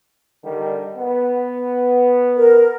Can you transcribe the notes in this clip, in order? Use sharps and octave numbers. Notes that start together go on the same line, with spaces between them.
D3 D#3 G3
B3
A#4